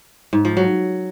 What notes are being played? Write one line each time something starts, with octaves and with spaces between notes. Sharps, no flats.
G#2
F3
F#3